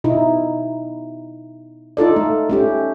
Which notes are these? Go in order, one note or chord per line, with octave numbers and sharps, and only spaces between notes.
B2 D#4 E4
D#4 F4 A4 D5
A3
A3 C#4 G4